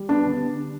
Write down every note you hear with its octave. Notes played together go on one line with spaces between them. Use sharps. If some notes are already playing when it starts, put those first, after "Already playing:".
Already playing: G3
B3 D4
D3